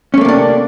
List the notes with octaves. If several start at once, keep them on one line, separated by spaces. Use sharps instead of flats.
C3 A3 A#3 C#4 D4